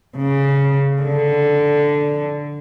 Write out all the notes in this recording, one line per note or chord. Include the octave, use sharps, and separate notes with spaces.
C#3
D3